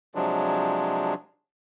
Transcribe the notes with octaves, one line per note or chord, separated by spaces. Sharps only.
C3 F3 F#3 G#3 D4